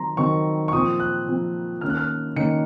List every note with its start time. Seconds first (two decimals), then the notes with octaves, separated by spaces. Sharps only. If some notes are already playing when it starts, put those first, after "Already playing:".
Already playing: D#3 F#3 C4 A#5 C6
0.17 D#3 F#3 C4 C#6
0.68 C#6
0.73 A#2 F3 C4 D#6
1.00 F#6
1.27 A#2 F3 C4
1.81 D#3 A#3 C#4 F6
1.89 F#6
1.97 F6
2.36 D#3 A#3 C#4 C#7